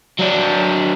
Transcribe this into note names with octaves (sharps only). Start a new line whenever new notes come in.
F#3 D4